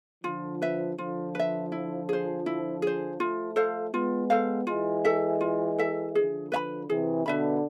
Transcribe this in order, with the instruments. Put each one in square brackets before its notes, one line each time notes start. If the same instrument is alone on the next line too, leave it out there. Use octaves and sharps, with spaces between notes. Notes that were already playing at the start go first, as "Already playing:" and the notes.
[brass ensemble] D3 F3 [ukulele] F4
[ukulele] B4 E5
[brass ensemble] D3 F3 [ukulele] F4
[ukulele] B4 E5
E4
G#4 C5
E4
G#4 C5
[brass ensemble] F3 A3 [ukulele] F4
[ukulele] A4 C5 F5
[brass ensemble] G#3 B3 [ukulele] F4
[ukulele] A4 C5 F5
[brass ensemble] E3 G#3 [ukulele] F4
[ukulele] A4 E5
F4
A4 E5
[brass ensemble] D3 F3 [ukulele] G#4
[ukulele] B4 E5 B5
[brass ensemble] C3 E3 [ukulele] G#4
[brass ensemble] B2 D3 [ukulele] B4 E5 B5